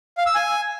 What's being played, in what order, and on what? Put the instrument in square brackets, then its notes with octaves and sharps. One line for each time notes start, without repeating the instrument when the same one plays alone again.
[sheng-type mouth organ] F5
E6
G#5